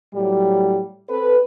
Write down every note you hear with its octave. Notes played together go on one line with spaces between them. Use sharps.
A2 F#3 G3
C4 A4 B4